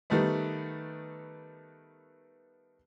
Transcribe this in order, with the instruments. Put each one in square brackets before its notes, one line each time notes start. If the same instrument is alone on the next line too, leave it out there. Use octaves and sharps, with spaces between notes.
[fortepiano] D#3 G3 A3 B3